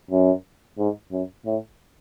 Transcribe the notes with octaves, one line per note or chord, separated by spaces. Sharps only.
F#2
G#2
F#2
A2